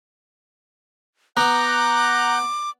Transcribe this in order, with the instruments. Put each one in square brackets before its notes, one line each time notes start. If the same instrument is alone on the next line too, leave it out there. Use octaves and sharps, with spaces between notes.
[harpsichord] B3 [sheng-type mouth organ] F#5 F#6 G6 [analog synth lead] A#5 [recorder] D6